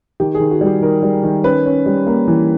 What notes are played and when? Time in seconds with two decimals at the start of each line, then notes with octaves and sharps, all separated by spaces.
0.20 D#3 G4
0.35 G#4
0.40 D#3
0.51 F#4
0.61 G3
0.67 G4
0.81 D#3 A#4
1.03 G3
1.23 D#3
1.44 C#4 B4
1.66 C#4
1.86 G3
2.07 A#3
2.28 E3